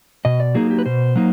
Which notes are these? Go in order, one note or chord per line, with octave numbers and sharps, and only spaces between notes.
B2 D#5
D5
F#3 A#3 D#4 G#4
G4
B4
B2 C5
F#3 A#3 D#4